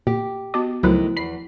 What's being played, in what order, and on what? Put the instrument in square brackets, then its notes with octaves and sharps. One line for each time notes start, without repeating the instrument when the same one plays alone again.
[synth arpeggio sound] A#2 [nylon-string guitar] G4
[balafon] B3 F#4 D6 [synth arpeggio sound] D#5
[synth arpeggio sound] C#2 F#3 B4 [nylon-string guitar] D#3 A3 [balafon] F3 E4 C5
[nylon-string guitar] E2 [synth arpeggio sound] B5 C7